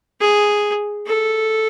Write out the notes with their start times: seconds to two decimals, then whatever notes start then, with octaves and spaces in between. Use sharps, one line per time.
0.21 G#4
1.06 A4